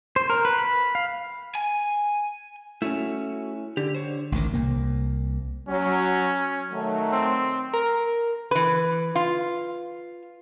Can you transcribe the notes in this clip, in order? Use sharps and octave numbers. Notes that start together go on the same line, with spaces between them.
C5
A#4
B4
B5
F5
G#5
A3 C#4 E4 F#4
D3 G4
C5 C#5
A1 D2 D#3
C2 A#3
F#3 C#4
D#3 F#3 A3
C4
A#4
E3 B4
F4